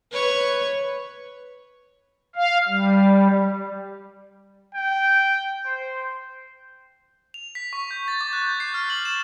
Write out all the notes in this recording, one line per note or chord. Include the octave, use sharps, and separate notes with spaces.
B4 C#5
F5
G3
G5
C5
F7
B6
C#6
G6
A6
D6
F#6
G6
C7
F6
F#7
E7